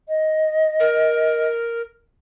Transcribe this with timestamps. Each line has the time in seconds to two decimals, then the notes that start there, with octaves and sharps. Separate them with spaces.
0.08 D#5
0.80 A#4